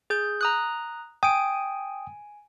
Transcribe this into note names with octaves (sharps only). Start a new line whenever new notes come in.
G#4 G6
A#5 D#6 F#6
G5 G#5 D#6 D7